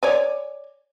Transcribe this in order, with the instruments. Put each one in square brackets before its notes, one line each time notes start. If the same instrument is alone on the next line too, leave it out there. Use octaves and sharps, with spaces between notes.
[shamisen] C#5 D5 G#5